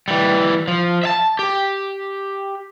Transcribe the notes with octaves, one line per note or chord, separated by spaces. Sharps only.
E3 G3
F3
E5 A5
G4